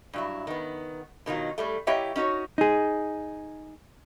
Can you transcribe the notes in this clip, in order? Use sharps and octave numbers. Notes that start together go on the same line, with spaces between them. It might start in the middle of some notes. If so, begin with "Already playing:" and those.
G2 F#3 E4
D#3 B3
B2 D#3 F#3 F4
A2 G3 A3
A#3 E4 G4 C#5 D#5 E5
C#4 D#4 F#4 C#5
D#4 G#4